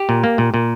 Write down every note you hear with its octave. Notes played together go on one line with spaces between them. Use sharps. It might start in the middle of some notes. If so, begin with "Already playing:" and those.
Already playing: G4
A#2
A#3
A#2
A#2